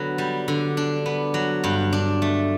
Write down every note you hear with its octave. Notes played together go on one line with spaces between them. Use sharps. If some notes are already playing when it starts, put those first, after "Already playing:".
Already playing: D3 F#3 B3 B4
G3
D3
D4
B3
F#3
G2
D4
A3